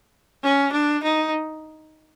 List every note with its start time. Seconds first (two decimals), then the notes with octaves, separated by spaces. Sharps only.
0.43 C#4
0.72 D4
1.03 D#4